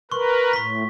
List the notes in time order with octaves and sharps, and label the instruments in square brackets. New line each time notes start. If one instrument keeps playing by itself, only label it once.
[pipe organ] A#4 B4 [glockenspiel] C6 C#6
[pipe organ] A2 [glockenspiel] C#6 B6